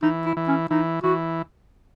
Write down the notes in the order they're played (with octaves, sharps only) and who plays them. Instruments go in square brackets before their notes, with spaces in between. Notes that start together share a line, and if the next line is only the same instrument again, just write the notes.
[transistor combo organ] E3 [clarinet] D#4
[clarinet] E4
[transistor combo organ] E3
[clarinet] C#4
[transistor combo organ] E3 [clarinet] D#4
[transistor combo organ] E3 [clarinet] F#4